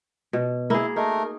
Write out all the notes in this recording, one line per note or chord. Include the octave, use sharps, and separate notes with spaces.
B2
A#3 E4 G#4
A3 D#4 A#4